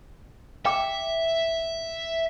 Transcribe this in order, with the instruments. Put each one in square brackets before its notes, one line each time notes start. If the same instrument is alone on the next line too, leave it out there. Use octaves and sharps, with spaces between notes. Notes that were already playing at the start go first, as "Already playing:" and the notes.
[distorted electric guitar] E5 [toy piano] G5 D6